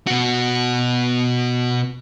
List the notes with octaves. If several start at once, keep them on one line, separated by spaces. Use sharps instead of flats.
B2 F#4